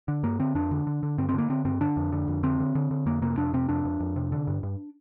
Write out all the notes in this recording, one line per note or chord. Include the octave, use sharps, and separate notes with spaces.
D3
G2 A#3
D3 C4
F2 D4
D3
D3
D3
G2 C4
C4
D3 A#3
D3 C4
G2 C4
D3 D4
F2
D3
F2
D3 C4
D3
D3
D3
F2 A#3
C3 A#3
F2 D4
C3 C4
F2 D4
F2
F2
C3
D3
G2
G2